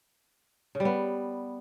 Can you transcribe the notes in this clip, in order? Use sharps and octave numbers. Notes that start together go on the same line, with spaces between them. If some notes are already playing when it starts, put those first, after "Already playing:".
C#3
G3
B3